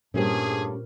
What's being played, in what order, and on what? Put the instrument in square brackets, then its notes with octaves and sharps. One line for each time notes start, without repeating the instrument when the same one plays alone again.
[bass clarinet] G2 [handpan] A#2 A#4 C5 [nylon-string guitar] G3 A3 C#4 [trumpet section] G#4